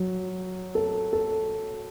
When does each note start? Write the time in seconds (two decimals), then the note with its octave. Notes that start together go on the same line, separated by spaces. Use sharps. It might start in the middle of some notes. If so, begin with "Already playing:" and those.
Already playing: F#3
0.75 A4
1.13 A4